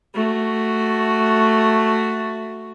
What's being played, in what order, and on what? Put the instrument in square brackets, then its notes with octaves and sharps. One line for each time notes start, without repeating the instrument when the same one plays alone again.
[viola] A3 F#4